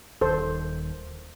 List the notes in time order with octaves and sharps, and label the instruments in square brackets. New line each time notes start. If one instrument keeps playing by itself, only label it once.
[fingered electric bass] D#1 D#3 [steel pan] A4 C5